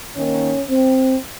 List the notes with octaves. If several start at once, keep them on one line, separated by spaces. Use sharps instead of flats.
D#3 A#3 C#4
C4